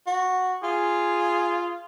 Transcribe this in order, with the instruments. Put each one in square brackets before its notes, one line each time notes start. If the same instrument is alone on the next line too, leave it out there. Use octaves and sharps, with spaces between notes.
[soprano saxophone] F#4
[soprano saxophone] F4 [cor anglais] G#4